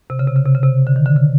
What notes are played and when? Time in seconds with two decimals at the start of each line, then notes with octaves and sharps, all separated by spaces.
0.10 C3
0.19 C#3
0.28 C3
0.36 C#3
0.45 C3
0.55 C#3
0.64 C3
0.87 D3
0.96 D#3
1.06 D3
1.16 C#3